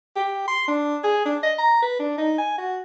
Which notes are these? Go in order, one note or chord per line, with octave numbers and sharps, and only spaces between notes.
G4
C6
D4
G#4
D4
D#5
A#5
B4
D4
D#4
G#5
F#4